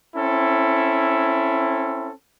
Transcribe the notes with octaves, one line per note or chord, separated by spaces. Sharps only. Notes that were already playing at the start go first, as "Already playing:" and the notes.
C4 C#4 E4 A4